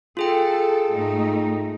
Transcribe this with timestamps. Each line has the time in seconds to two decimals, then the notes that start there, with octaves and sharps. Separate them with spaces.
0.17 F4 G#4 A4 G5
0.91 G#2 A3 D#4